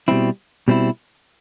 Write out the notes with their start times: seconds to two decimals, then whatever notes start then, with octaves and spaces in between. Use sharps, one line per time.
0.08 B2 G3 C4 E4
0.68 B2 G3 C4 E4